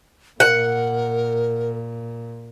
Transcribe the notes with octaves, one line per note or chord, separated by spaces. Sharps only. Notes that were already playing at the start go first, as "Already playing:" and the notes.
A#2 A#4 F#5